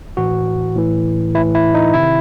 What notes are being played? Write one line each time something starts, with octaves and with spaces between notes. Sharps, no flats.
A2 E3 F#4
A2 E3
A2 E3 E4
E4
D#4
C3 D#3 E4